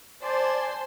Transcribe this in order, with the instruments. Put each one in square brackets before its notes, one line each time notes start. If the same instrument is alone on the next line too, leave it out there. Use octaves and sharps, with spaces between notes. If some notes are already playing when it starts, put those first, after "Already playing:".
[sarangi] C5 [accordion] D5 [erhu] G#5 [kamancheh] A5 C6